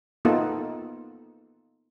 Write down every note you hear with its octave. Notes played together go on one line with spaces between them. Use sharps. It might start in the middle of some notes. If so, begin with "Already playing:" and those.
A#3 B3 D#4 F4 A4